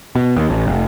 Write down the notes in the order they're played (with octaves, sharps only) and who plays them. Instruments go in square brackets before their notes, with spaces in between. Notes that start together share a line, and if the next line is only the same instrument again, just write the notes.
[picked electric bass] B2
D#2
A1
F1